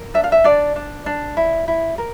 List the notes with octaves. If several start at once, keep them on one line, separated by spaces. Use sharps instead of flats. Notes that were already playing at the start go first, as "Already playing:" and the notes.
Already playing: A#4
D4 E5
F5
E5
D4 D5
D4
D4
E4
E4
A#4